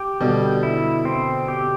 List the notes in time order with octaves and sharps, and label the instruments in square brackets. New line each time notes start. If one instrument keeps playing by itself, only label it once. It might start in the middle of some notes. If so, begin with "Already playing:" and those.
Already playing: [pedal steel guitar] G4
[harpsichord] B2 D3 [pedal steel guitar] G3
[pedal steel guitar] E4
C4
G4